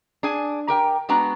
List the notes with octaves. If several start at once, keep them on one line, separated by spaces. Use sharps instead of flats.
D4 G#4 G#5
G4 A#4 G5
G#3 B3 D4 F#4 A#5